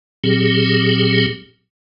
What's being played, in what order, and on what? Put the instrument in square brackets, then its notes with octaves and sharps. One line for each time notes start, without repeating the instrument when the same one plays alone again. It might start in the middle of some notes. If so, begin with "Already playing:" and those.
[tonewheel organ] A#2 F#3 C4 G4 G#4